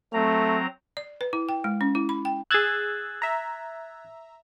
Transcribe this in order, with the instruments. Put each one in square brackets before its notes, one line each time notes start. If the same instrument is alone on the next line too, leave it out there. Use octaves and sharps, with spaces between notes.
[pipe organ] F#3 C4 A#5 [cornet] A3
[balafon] D5
B4
E4
G5
G#3
C#4
E4
B5
G5
[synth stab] G#4 E6 [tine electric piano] F#6 G#6 A6
[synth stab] E5 A#5